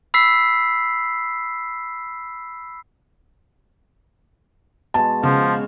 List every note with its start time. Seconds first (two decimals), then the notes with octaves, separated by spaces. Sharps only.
0.14 B5 E6 B6 C7
4.94 B2 G#3 A5
5.23 C#3 F3